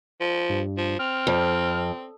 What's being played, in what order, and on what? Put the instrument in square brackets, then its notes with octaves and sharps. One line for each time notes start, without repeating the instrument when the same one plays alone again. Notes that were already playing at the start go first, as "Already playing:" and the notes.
[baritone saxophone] F3
[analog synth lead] G2
[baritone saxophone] F3
[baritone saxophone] C4 [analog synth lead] F6
[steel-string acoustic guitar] F2